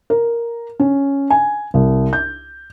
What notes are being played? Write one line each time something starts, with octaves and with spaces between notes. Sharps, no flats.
A#4
C#4
G#5
C2
G6